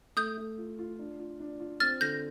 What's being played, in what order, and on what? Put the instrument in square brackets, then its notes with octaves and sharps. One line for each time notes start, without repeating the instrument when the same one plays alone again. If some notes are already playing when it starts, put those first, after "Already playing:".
[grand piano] A3 [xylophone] D#6 G6
[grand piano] A3
F4
F4
D4
F4
D4
F4
[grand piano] C4 [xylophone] F6 A6
[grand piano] D3 [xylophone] G6 A#6